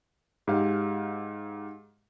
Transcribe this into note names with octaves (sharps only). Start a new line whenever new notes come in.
G#2 G4 F5